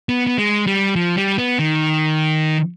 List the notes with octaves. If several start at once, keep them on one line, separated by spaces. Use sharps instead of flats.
B3
B3
G#3
G3
F3
G3
B3
D#3